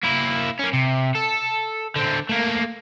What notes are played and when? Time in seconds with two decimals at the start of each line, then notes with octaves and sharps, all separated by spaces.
0.03 A#3 E4
0.59 A#3 C#4
0.73 C3
1.15 A4
1.96 D3 C4
2.29 A3 A#3